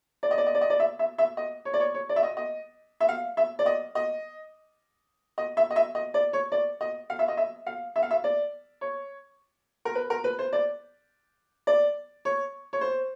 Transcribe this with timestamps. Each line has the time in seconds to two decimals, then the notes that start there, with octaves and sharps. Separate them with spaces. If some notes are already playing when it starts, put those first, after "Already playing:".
0.23 D5
0.31 D#5
0.38 D5
0.46 D#5
0.55 D5
0.61 D#5
0.70 D5
0.80 E5
0.99 E5
1.18 E5
1.37 D#5
1.65 C#5
1.74 D5
1.80 C#5
1.94 C#5
2.09 D5
2.16 E5
2.23 D#5
2.37 D#5
3.00 E5
3.09 F5
3.37 E5
3.59 D5
3.66 D#5
3.95 D#5
5.38 D#5
5.57 E5
5.71 D#5
5.76 E5
5.95 D#5
6.14 D5
6.33 C#5
6.52 D5
6.81 D#5
7.10 F5
7.19 E5
7.28 D#5
7.37 E5
7.67 F5
7.96 E5
8.03 F5
8.11 E5
8.24 D5
8.81 C#5
9.85 A#4
9.95 B4
10.10 A#4
10.24 B4
10.39 C5
10.53 D5
11.67 D5
12.25 C#5
12.73 C#5
12.81 C5